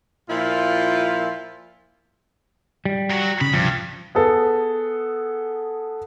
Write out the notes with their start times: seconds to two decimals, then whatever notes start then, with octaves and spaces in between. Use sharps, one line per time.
0.29 A#2 F3 E4 F4
2.85 G3
3.11 F#3 F#4
3.41 C#3 B5
3.54 C2 G2 F3
4.15 B3 G#4 A4